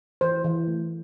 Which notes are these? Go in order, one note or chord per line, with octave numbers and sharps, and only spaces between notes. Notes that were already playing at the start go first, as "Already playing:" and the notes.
E3 C5
E3
A3